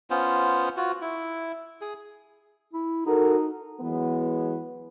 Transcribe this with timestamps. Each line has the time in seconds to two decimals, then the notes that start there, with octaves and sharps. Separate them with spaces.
0.10 B3 C#4 F4 C5
0.77 F4 F#4
1.01 E4
1.81 G#4
2.73 E4
3.06 D#4 F#4 A4 A#4
3.81 E3 F#3 G#3 B3